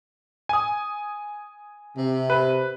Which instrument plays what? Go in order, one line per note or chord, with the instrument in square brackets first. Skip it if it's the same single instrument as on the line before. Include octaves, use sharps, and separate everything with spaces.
[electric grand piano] G#5 D#6
[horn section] C3
[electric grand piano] B4